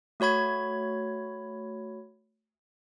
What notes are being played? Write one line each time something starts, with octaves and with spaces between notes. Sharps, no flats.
A3 F#4 C#5 B5 G#6